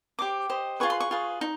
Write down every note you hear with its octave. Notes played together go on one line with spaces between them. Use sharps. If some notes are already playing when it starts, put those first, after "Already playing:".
G4 C5 D#5 D6
G4 C5 D#5
F4 G#4 B4 C#6
C6
C#6
F4 G#4 B4
D#4